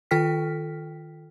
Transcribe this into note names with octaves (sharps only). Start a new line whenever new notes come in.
D#3 F4 A4 G5 F6 B6